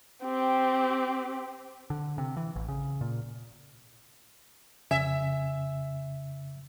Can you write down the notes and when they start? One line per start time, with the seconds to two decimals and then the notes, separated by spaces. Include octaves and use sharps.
0.24 C4 G4
1.90 D3
2.18 C3
2.37 E3
2.56 A1
2.68 C#3
3.01 A#2
4.91 F2 C#3 E5 G#5